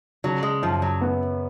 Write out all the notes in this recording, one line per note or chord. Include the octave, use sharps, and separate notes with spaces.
C#3 F#3
G#3
F#2 F3
F#3
B3